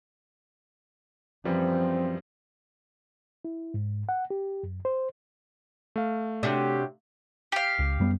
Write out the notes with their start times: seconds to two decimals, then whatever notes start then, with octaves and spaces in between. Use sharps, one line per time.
1.45 F#2 E3 F3 G3 C4
3.45 E4
3.74 G#2
4.09 F#5
4.30 G4
4.63 F#2
4.85 C5
5.96 A3 F5
6.43 C3 D4 F#4 G4 C#5
7.52 G4 F5
7.79 C#2
8.00 F#2 G3 B3